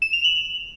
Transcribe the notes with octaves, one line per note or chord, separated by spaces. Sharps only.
E7
F7
F#7